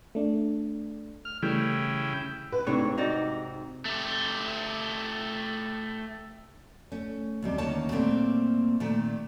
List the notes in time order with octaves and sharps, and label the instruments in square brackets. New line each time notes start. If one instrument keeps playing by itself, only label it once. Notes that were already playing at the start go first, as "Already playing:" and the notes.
[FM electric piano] A3 D4
[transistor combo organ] F6
[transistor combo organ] C#3 E4 G5 [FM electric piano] E3 G3 A3
[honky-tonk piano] B4
[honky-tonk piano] G#2 C3 [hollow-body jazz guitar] A3 D4 C#5
[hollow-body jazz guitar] D#4 F#4 D5
[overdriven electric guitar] A3 G4
[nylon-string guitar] A3 C#4
D#2 C3 G3
D2 D#3 A#3 C#4 C#5 A5
A#2 G3 A3 A#3 C4
A#2 D#3 A3